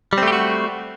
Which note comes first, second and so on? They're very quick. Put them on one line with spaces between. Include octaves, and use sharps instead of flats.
G3 C4 A3 G4 F#4